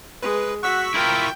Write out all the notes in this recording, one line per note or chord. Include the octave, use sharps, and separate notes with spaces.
G#3 B4
F#4 F#5 C#6 E6 B6
E4 F4 A#4 G5